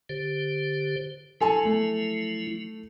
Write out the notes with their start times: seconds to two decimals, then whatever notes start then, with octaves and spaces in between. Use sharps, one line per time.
0.09 D3 G4 C5
1.41 F3 F#3 E4 A4 G#5 A5
1.65 A3